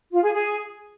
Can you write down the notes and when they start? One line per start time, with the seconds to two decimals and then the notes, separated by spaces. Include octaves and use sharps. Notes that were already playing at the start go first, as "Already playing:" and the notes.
0.12 F4
0.23 G#4
0.34 G#4